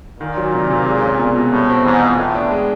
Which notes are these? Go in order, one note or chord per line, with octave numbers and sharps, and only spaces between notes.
A#2 D#3
F#3
C3
C3
G#3
C#4
B2
B2
A2 G3
C4
G#2 E3
F4
A2 B3
D4
G#3